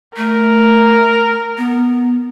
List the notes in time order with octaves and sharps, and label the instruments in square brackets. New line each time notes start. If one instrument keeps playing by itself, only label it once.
[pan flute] A3 [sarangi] A#4
[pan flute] B3